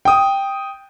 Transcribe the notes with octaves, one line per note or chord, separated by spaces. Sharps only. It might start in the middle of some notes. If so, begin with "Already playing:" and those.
G5 D#6